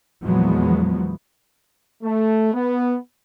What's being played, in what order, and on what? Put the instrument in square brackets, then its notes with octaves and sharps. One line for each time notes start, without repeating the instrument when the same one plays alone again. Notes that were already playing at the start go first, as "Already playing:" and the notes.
[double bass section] E2 A#2 F3 F#3 G#3 B3
[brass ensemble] A3
B3